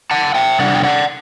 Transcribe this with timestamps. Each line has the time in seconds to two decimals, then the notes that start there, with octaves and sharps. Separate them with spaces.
0.11 F#5 A5
0.35 E5 G5
0.59 C3 G3 D4 D5 F#5
0.74 G5
0.83 D5 F#5